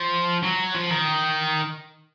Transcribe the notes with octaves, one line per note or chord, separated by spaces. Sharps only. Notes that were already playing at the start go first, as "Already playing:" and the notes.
Already playing: F3
F#3
F3
D#3